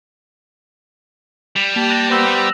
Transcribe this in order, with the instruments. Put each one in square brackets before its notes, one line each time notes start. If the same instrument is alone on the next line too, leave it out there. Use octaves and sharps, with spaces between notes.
[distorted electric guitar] G3 [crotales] E7
[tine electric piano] A#3 [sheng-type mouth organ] G4 A5 [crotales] F7
[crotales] F#6 A#6
[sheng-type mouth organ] B3 G4 C5 [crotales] E6 A#6 E7